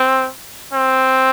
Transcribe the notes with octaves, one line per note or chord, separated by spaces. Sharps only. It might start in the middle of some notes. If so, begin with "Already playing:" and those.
Already playing: C4
C4